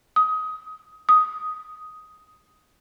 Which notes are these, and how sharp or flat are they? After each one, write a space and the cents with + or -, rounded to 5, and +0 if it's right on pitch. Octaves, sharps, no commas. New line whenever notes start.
D#6 +20
D#6 +5